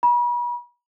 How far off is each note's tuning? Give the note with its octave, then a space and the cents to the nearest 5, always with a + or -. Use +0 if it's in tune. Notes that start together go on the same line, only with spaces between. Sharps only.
B5 -40